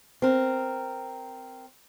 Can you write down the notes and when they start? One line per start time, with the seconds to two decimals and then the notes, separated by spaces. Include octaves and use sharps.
0.22 C4 A#4